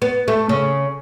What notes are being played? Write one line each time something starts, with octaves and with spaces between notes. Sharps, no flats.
B3
A3
C#3